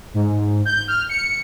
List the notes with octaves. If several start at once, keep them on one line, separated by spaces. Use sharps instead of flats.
G#2
G6
F6
C#7